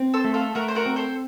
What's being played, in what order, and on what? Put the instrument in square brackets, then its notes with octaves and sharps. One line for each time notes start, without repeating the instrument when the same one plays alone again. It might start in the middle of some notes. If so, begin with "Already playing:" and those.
Already playing: [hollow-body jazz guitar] C4
[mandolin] A4 C5
[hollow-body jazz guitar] A3
[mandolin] F4 A4
[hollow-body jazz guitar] A3 [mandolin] F#4 A#4
[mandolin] C5
F#4 A#4
[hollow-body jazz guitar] C4
[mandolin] A4 C5